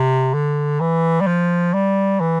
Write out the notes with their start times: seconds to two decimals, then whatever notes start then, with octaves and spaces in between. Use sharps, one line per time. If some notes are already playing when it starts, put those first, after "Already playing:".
Already playing: C3
0.34 D3
0.80 E3
1.21 G3
1.27 F3
1.73 G3
2.20 E3